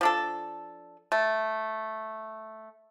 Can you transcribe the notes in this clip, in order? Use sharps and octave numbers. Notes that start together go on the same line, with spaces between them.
F3 D4 A4
A3